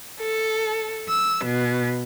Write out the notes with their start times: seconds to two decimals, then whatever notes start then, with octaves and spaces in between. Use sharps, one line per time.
0.19 A4
1.08 E6
1.45 B2